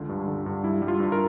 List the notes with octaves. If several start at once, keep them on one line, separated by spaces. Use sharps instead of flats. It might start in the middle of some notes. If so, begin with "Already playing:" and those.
Already playing: C#2 D3 F4
G2
D3
G2
G3 E4
G3
F4
G2
A#4